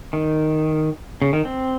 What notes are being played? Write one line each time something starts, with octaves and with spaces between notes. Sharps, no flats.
D#3
C#3
D#3
C4